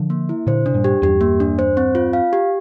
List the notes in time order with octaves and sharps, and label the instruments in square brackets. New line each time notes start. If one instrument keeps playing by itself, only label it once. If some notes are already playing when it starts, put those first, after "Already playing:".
Already playing: [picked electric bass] D3 F3
[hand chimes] A#3
E4
[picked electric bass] A#2 D3 [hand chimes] C5
[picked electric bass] C3 [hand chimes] D4
[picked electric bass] G2 A#2
[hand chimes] G4
[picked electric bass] E2 G2 [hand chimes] G4
[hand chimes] A#3
D4
C5
C4
F4
F5
G4